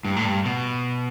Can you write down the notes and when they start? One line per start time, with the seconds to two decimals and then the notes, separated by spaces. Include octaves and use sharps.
0.05 G2
0.16 A2
0.25 G2
0.45 B2